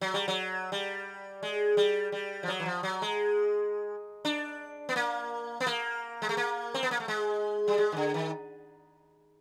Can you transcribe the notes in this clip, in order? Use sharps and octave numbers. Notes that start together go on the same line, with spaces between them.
F#3
G3
F#3
G3
G#3
G3
G3
F3
F#3
E3
F3
F#3
G#3
D4
B3
A#3
B3
A#3
G#3
A3
A#3
C4
B3
A#3
A3
G#3
G3
G#3
D#3
D3
D#3